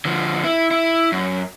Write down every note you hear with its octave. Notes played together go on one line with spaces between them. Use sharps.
D3 F3
E4
E4
F#2